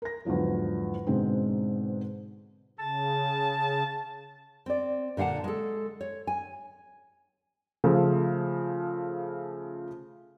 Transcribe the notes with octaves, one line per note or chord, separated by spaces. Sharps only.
A#4 A#6
E2 G#2 D3 F3 F#3
G#2 B2 D3 G#3 C4 D#4
C#3 A5
C4 D5
A#2 D3 F5 F#5 A5
G#3 A4
C#5
G#5
C#3 F3 A3